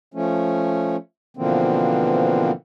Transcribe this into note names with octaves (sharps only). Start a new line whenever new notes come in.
F3 A3 C#4
B2 D3 E3 F3 A#3 C4